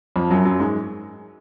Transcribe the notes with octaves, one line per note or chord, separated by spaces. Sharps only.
F2 F3
F#2 F#3
F#2 F#3
G#2 G#3